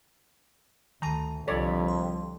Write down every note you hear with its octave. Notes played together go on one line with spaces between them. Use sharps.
D2 D#3 A5 A#5 D#7
C2 F2 D3 F3 A4 C#5 D5 B6
C6